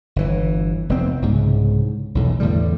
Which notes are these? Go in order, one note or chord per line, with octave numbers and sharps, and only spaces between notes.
G1 E3
F1 B3 C4
C2 G#2 C#3
B1 E2 A2
E2 A2 D3 G3